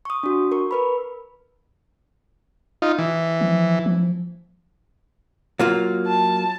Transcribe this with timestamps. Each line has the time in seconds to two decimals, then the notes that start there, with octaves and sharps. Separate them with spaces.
0.05 C#6 D#6
0.23 D4 F#4
0.52 A#4 C#6
0.71 A#4 B4 B5
2.82 D#4 F4
2.99 E3
3.41 F3
3.86 F3
5.59 F#3 A#3 F4
6.07 A5